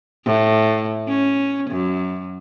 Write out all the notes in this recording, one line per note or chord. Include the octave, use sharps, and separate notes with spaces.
A2
C#4
F#2